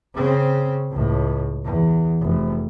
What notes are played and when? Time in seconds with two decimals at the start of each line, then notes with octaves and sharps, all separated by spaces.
0.14 C#3 C4
0.91 C#2 A2
1.64 E2
2.21 F1